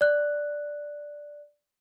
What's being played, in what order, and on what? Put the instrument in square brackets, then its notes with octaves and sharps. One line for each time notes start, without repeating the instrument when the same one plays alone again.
[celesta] D5 F#6